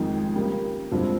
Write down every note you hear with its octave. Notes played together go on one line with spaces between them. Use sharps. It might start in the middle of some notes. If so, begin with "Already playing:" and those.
Already playing: F2 D#3 G#3 D#4 G#4
C#3 G3 A#3
G2 F3 G#3 C4